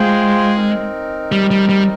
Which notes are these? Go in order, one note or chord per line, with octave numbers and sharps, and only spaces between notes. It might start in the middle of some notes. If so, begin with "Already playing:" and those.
Already playing: G#3 F4 G#4 C5 G5
C4 D#4 A#4
G3
G3
G3